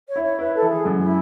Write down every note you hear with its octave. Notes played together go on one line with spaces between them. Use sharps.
C#5
E4
C#5
E4 B4
A4
E3
G#4
F#2
E4